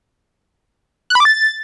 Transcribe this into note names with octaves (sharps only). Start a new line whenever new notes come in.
F#6
B5
D6
A6